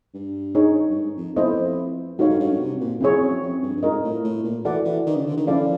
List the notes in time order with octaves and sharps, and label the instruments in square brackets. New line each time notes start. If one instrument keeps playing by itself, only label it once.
[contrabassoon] G2
[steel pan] D#4 G#4 C#5
[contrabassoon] G2
G#2
F2
[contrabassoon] F2 [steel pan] B3 E4 A4 C5 D#5
[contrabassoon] G#2 [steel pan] D#4 F#4 A4 C#5 F5
[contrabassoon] G2
G2
F#2
C3
A#2
[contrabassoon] F2 [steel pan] C4 E4 G#4 C#5
[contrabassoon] F#2
F2
G2
G2
[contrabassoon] G#2 [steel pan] F4 A#4 D#5
[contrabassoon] A2
A2
A#2
[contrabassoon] E3 [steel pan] F#4 A4 D5 F#5
[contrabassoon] E3
D#3
C#3
D3
D#3
[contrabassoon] F3 [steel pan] C#4 E4 A4 D5 F5